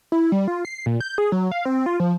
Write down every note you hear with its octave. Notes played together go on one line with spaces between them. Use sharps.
E4
G3
F4
C7
A#2
G6
G#4
F#3
F5
C4
F4
F3